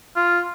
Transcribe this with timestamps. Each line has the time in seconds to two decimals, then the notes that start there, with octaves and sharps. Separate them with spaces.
0.16 F4